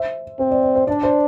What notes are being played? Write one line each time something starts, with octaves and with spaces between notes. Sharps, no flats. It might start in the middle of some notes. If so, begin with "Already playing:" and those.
Already playing: C5 E5
C4 C5
D5
D5
C5
D4 D5
C5